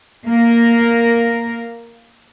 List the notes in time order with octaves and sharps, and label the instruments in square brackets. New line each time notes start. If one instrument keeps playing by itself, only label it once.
[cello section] A#3 A#4